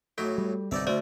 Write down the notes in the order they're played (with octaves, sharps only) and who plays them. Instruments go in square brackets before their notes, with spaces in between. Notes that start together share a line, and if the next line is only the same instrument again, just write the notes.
[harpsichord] A2 F#3 D#4 [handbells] A4
[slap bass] G3
[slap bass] G1 C2 C4 [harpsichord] D#4 D5 E5
[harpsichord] D2 D3 A3 [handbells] C5 D5 E5